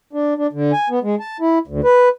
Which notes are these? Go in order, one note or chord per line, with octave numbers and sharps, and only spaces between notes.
D4
D4
D3
G#5
B3
G#3
A5
E4
D2
B4